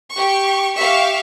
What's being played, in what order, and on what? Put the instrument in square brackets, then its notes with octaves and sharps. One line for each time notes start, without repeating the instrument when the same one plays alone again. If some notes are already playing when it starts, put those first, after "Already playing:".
[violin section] G4 C#6
G4 E5 F5 C#6